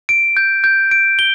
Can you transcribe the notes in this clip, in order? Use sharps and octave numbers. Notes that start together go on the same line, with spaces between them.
D7
G6
G6
D7
G7